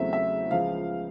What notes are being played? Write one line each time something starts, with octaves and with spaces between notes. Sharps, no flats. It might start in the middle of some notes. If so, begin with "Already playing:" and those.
Already playing: E2 C#3 F#3 A3 C4 E5
E5
C#2 C#3 F3 F5